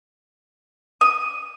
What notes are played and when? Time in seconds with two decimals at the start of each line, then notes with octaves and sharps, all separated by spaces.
1.01 D#6